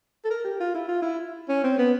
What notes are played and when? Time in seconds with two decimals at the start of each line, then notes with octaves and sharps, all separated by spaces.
0.24 A4
0.30 A#4
0.44 G4
0.60 F4
0.74 E4
0.88 F4
1.02 E4
1.49 C#4
1.64 C4
1.78 B3